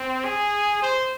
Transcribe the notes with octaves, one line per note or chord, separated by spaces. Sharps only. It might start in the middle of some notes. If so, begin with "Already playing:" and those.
Already playing: C4
G#4
C5